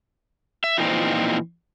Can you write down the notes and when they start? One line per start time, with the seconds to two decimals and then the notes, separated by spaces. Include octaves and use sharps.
0.64 E5
0.78 A#2 E3 F3 C4 D#4